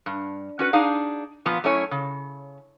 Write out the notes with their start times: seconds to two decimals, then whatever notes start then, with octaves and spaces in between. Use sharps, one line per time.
0.06 G2
0.59 C#4 F#4 B4
0.73 D4 D#4 G#4 F5
1.45 A#2 F3 B3
1.64 F#2 A3 C#4 E4 C#5 G#5
1.91 C#3